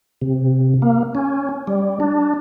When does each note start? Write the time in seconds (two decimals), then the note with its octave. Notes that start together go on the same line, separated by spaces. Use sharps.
0.22 C3
0.82 A#3
1.15 C#4
1.67 G3
2.00 D4